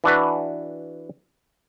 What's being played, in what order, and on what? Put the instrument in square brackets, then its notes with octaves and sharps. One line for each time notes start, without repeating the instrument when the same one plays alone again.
[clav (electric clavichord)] E3 D4 F#4 B4